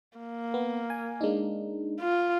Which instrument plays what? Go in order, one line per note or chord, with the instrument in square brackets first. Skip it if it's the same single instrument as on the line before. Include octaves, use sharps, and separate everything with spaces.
[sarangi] A#3
[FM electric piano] B3
G#5
G#3 D4 D#4
[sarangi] F4